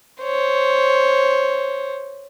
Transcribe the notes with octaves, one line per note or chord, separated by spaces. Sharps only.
C5 C#5